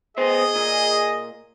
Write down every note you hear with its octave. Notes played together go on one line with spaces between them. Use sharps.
B3 G#4 C5 D#5
A#2